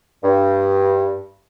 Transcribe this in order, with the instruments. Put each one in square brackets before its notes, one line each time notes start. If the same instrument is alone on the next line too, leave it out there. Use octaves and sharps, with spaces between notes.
[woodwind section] G2